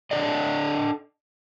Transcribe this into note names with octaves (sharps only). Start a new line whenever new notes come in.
D4 A4 D5 D#5